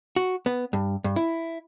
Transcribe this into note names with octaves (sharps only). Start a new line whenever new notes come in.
F#4
B3
G2
G2
E4